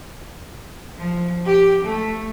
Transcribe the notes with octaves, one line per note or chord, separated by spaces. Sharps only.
F3
G4
A3